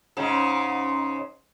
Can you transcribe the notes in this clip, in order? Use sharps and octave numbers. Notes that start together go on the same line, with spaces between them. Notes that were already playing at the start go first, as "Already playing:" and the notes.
G#2 C#3